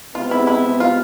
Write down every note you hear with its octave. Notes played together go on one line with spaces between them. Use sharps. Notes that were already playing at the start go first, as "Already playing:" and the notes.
C3 G#3 B3 F4
E4
E4
F4